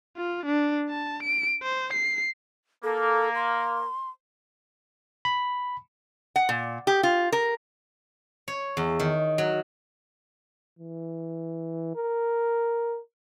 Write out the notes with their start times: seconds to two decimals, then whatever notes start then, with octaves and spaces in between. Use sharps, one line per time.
0.17 F4
0.46 D4
0.89 A5
1.23 D7
1.63 C5
1.93 C7
2.84 A#3 A4
3.35 C6
5.25 B5
6.36 F#5
6.49 A#2
6.87 G4
7.03 F4
7.32 A#4
8.48 C#5
8.77 E2
9.00 D#3
9.38 F#3
10.79 E3
11.96 A#4